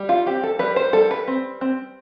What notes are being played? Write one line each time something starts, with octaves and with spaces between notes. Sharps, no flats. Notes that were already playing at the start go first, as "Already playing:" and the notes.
Already playing: G3
F4
C4 G4
A4
G3 B4
C5
G3 A4
B4
C4
C4